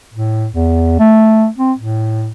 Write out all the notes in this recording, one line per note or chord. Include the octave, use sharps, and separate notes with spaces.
A2
E2
A3
C4
A2